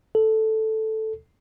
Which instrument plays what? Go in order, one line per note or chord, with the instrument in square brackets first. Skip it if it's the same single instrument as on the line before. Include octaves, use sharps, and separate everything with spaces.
[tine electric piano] A4